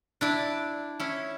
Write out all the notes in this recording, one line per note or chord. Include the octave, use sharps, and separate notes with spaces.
D4 E4 D5
C#4 E4